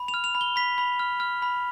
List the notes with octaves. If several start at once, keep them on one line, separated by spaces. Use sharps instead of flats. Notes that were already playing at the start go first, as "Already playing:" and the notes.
Already playing: B5
F7
F6
F7
B5
G7
B5 B6
B5
F6
F6
B5